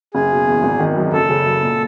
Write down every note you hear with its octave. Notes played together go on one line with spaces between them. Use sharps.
F#1 G#4
B2
E2
G#1
D#3
F#2
F#1 A4
C#3
F#2
A#2